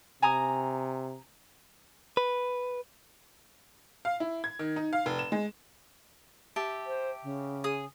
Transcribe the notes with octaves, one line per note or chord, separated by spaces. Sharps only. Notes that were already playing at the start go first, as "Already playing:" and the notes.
C3 G#5 A#5 D#6
B4
F5
E4
G#6
D#3
D#4
F5
F1
E7
G#3
G4 E5 A5
C5
C#3
G#4 D#6